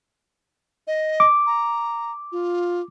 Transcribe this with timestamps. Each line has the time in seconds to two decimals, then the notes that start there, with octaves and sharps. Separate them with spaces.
0.87 D#5
1.20 D6
1.47 A#5
2.32 F4